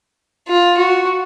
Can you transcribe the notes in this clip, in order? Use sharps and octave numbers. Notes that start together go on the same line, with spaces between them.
F4
F#4